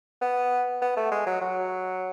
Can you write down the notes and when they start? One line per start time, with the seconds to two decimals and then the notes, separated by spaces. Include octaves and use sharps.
0.21 B3
0.82 B3
0.97 A3
1.12 G#3
1.26 F#3
1.41 F#3